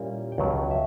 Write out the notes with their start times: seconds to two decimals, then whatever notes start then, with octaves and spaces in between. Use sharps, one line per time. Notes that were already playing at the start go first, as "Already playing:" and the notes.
Already playing: A#2 G3 A#3 C#4 E4
0.32 G5
0.38 C#2 B2 F#3 C#4 F#5
0.71 E5